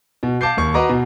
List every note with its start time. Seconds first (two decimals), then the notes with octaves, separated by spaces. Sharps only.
0.23 B2
0.41 F5 A5 D6 G6 C7
0.57 D#2 A#3 C#6
0.74 F#4 B4 D#5 A#5 D6
0.89 B2